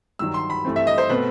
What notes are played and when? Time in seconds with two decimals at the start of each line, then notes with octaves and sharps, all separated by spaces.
0.19 G2 D#3 F#3 E6
0.34 C6
0.50 B5
0.65 G2 E3 A3 C4
0.76 E5
0.87 D#5
0.98 C5
1.10 B2 A3 C4 B4